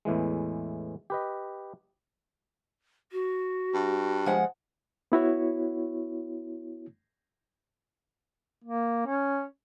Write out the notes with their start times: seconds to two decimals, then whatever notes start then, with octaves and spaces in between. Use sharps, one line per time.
0.05 E2 A2 E3 G#3
1.10 G4 B4 D#5
3.12 F#4
3.74 G2
4.26 F3 G#3 F#5
5.12 B3 E4 F#4 C#5
8.64 A#3
9.06 C#4